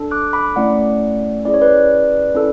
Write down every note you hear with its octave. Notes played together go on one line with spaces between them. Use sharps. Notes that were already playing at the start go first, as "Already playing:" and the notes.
Already playing: D4 A4
D6 F#6
B5 D6
A3 C#4 E4 D5 F#5
C#4 E4 G#4 D5
C#5
B4 D5
C#4 E4 A4